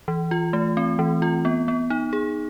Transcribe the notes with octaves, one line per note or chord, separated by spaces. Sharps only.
E3
F4
A3
C4
E3
F4
B3
B3
D#4
G#4